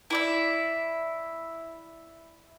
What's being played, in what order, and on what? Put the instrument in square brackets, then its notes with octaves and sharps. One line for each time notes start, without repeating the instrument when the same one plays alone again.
[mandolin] E4 D5 E5